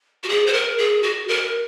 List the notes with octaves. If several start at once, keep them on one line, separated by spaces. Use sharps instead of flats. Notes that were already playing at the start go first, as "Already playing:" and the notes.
F#4
G#4
C5
A#4
G#4
F#4
A#4